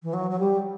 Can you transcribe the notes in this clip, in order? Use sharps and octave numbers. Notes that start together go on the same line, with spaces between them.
E3
F#3
F#3
G3